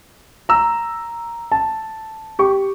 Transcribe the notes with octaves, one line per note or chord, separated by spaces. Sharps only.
A#5 E6
A5
G4 C#6